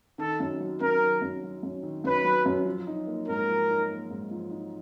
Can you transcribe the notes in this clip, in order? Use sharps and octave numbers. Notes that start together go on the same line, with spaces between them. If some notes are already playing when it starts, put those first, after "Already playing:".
D#3 A4
F#2
F#3
F#2 A#4
D#3
F#2
F#3
F#2
D#3
F#2 B4
F#3
F#2
F3
D#4
A#3
G#2 A#4
F3
D#4
A#3
G#2
F3
D#4